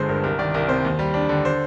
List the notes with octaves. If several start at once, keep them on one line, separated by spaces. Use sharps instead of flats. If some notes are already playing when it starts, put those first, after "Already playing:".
Already playing: G1 D3 G#3 C5
G2 A#4
C2 A#4
D#3 D5
C2 A#4
C3 C5
D#2
G3
D4
D3
C5